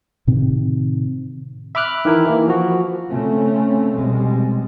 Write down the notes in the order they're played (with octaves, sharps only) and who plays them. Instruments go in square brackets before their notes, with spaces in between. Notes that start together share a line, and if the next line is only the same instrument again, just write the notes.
[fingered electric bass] A2 C3 D#3 C4
[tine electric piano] E5 B5 D6 F6 F#6
D#3 E3 E4 A#4
E3 A#3
F3 F#4
[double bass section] C#3 A3 C4 C#4
F1 B2 G3 G#3 C4